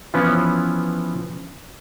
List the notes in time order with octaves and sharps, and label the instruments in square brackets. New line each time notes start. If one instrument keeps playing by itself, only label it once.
[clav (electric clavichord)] E3 F3 B3 C#4